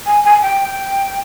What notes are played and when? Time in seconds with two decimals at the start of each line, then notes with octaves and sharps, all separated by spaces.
0.06 G#5
0.24 G#5
0.42 G5